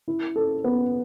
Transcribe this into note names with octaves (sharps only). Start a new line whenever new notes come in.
E4
A4
B3